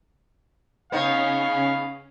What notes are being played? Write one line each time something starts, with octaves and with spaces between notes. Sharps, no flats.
C#3 B3 C#4 D#4 C#5 F5